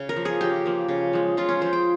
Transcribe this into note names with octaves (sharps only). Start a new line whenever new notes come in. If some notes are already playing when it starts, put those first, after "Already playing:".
Already playing: C#3
A#4
F3 A#3
G#4
C#3 G4
F3 A#3
C#3
F3 G#3
C#3 F4
C#4
F3 G#3 C5
G5